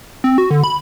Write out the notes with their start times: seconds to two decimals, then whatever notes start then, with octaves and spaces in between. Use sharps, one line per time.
0.24 C4
0.38 F#4
0.51 D3
0.64 B5